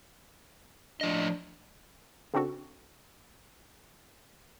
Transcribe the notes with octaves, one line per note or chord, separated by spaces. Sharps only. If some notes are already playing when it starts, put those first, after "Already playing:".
A2 F3 D4 D#5
C#3 C4 D4 F#4 A4